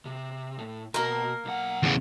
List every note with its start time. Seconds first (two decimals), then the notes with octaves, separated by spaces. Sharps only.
0.05 C3
0.58 A2
0.94 B2 A#3 A#4
1.45 B1 F#5
1.83 E2 C#3